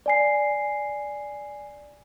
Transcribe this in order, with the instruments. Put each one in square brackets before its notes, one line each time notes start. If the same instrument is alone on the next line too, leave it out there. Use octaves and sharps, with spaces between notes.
[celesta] D5 G#5 C7